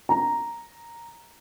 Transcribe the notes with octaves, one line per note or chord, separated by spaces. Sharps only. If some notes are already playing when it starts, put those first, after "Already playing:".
A#5